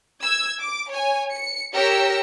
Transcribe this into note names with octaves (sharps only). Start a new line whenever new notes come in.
E6 G#6
D6
C#5 G#5
C#7
G4 A#4 C#5 E6 A#6 C#7